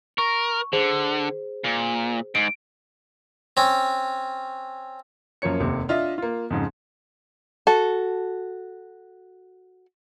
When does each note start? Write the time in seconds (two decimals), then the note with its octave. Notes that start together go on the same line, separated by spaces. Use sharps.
0.18 A#4 C#6
0.73 D3 G#4 C5
1.64 A#2
2.35 G#2 D7
3.57 C4 C#4
5.42 F#2 F3 A#3 C#5 C#7
5.60 F1 D#2 C3
5.89 D4 F4 D#5 E5
6.18 A#3 F4
6.50 F2 G#2 C#3
7.67 F#4 A4